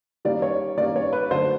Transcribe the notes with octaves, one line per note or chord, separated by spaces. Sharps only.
D#3 G3 A#3 C#4 D5
C#5
D#3 G3 A#3 C#4 D5
C#5
B4
D3 F#3 A3 C5